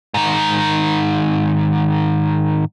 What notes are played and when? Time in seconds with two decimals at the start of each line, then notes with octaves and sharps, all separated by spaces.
0.14 G#2 D#3